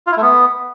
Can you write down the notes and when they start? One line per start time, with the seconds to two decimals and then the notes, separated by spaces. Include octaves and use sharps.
0.07 F4
0.12 E4
0.17 A3
0.22 B3